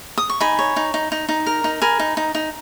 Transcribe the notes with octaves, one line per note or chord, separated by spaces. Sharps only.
D#6
C#6
D#4 G#5 B5
C#5
D#4
D#4
D#4
D#4
A#4
D#4
A#4 G#5 B5
D#4
D#4
D#4